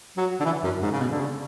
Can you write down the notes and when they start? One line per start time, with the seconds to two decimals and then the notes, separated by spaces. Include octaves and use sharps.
0.17 F#3
0.40 D3
0.45 E3
0.64 F#2
0.82 G#2
0.92 C#3
1.01 B2
1.12 D3
1.20 C#3